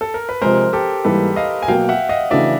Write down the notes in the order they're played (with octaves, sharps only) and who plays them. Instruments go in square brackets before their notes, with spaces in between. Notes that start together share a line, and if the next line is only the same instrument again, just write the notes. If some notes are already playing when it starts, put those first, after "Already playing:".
[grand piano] A4
A#4
B4
[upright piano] C3 F3 G#3 [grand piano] A#4 C5
[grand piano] G4 A4
[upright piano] G#2 E3 G3 A#3 [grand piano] A4 B4
[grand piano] D#5 F5
G#5
[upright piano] B2 F#3 A#3 [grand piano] F5 G5
[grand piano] E5 F#5
D#5 F5
[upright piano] C#3 E3 A3 D4 F#4 [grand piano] D5 E5